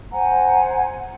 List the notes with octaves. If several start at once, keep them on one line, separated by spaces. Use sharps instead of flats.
C5 F#5 G#5 A#5